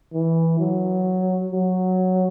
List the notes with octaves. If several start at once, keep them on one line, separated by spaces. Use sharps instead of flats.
E3
F#3
F#3